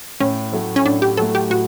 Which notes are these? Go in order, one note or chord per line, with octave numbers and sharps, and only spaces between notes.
A2 C#4
F#3 A3
C#4
A2 D4
G4
F#3 A3 A4
G4
A2 F#4